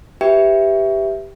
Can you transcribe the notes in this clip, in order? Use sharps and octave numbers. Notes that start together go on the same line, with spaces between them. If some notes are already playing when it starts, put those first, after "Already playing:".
G4 B4 E5 G5